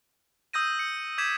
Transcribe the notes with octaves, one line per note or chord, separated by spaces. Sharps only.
D#6 E6 G6 A#6 D#7
C#7
D6 G6 G#6 B6 E7